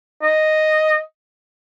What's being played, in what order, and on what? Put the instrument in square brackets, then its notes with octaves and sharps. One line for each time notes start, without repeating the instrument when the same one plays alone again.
[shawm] D#5